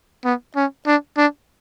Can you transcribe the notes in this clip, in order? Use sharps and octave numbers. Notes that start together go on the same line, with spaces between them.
B3
C#4
D4
D4